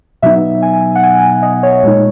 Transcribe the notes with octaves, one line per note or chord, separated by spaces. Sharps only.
B2 F#3 B3 D#4 E5
G#5
F#5
G#5
D#5
C#5
A#2 G#3 D#4